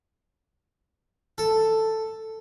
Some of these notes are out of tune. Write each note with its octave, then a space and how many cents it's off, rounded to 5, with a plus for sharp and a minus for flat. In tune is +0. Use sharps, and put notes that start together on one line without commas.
A4 +5